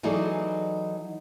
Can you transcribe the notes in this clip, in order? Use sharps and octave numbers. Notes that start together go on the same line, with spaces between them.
E3 F#3 D#4 G#4 A4 D5